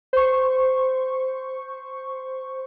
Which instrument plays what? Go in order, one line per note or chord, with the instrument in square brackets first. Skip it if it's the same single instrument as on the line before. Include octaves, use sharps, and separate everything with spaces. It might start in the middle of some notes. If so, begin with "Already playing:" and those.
[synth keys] C5 C#6